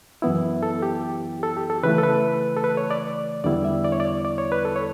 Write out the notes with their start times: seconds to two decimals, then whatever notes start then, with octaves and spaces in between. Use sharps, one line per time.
0.22 F#2 E3 B3 E4
0.63 A4
0.82 G4
1.43 A4
1.57 G4
1.70 A4
1.83 C#3 E3 A3 B4
1.98 A4
2.03 B4
2.57 A4
2.64 B4
2.77 C#5
2.91 D5
3.44 E2 D3 G3 B3 E4 D5
3.65 E5
3.84 D5
3.92 C#5
4.00 D5
4.25 D5
4.38 C#5
4.52 B4
4.65 A4
4.76 C#5